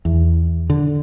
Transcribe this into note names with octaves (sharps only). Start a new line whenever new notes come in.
E2
D3